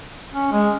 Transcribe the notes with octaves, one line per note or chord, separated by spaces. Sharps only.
C#4
G#3